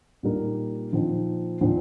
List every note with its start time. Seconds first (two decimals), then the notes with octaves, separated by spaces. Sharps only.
0.23 A#2 G3 A#3 D#4 A#4
0.92 A#2 F3 C4 D#4
1.61 A#2 F3 C4 D#4